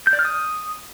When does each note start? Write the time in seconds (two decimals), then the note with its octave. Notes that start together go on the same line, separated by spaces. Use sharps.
0.07 G6
0.13 D5
0.19 F6
0.25 D#6